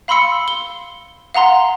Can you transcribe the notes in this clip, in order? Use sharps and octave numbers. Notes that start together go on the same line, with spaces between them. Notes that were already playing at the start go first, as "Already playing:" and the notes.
F5 B5 C6 E6 C#7
G7
F5 F#5 A#5 C6